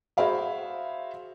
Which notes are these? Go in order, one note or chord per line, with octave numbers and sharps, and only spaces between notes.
F#4 G#4 C5 E5 F5 B5